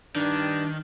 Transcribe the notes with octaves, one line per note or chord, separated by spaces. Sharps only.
G2 D#3 D4